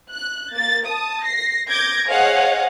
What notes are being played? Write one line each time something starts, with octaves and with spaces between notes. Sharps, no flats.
F#6
A#3 A6
A5 D#6
A#6 C7
D6 G6 G#6 A#6 D7
G#4 C5 C#5 D#5 F5 F#5